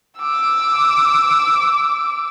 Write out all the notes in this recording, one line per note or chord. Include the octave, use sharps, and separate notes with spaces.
D6 E6